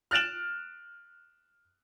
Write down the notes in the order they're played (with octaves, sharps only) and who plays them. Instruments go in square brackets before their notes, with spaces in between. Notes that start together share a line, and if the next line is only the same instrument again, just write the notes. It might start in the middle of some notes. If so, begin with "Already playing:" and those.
[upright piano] F6 F#6 A6 D7 E7 F#7